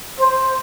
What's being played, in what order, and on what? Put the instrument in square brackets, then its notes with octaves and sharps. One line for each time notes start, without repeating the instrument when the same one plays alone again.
[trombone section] C5